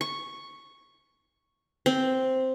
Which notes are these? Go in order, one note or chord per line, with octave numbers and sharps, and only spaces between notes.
C#6
C4